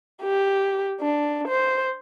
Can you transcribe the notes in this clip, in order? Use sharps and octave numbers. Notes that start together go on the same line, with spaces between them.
G4
D4
C5